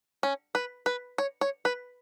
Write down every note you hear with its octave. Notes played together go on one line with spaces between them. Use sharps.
C#4
B4
B4
C#5
C#5
B4